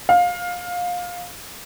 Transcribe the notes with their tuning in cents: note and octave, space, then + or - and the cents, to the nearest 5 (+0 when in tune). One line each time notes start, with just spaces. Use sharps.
F5 +20